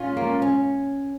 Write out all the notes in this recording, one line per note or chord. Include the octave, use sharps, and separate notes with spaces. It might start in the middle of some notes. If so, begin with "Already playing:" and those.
Already playing: A#2 G#3 C#4 F4
A#3
C#4